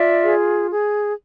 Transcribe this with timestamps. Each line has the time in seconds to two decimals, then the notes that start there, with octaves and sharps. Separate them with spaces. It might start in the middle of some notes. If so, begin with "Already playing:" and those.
Already playing: F4 D5 E5
0.25 G#4
0.70 G#4